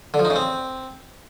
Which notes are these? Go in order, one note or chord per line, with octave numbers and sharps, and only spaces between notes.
D3
F3
D#4
C#3
C4